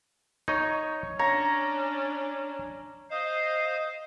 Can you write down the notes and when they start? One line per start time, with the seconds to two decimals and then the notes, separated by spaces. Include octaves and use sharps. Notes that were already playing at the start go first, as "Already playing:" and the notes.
0.48 D#4 C#5 D#5
1.19 C#4 D4 C#5 A#5
3.10 C5 D#5 F5